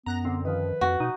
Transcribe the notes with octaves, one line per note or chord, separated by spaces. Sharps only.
F#2 B3 A#5 F#6 A#6
D3 C4
D#3 F3 B4
F2 F#4
B2 D#4